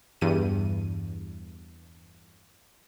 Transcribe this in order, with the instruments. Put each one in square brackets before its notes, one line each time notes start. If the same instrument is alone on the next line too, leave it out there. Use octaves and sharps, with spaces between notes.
[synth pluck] E2 G2 D#7